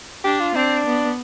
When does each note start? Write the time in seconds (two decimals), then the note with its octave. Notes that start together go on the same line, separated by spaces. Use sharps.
0.24 D4 G4
0.40 F4
0.55 C4 D4
0.86 B3